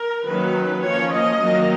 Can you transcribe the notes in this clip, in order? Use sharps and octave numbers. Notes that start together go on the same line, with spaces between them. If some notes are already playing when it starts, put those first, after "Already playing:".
Already playing: A#4
D#3 F#3 A#3 C#4 B4
F3 A#3 C#4 C#5
D#5
D#3 F#3 A#3